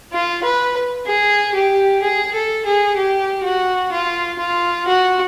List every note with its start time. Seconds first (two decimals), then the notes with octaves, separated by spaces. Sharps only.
0.12 F4
0.43 B4
1.06 G#4
1.54 G4
2.02 G#4
2.34 A4
2.65 G#4
2.96 G4
3.44 F#4
3.92 F4
4.39 F4
4.87 F#4